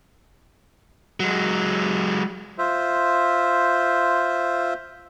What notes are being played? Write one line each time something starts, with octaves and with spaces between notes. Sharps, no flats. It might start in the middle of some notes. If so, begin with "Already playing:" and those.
F#3 G#3
F4 C5 E5